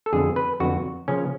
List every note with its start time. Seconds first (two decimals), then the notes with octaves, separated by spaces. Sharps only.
0.06 A4
0.13 F2 D3 F#3 B3 G#4
0.36 B4
0.60 F2 D3 F#3 B3 F#4
1.08 C#3 F3 A#3 C#4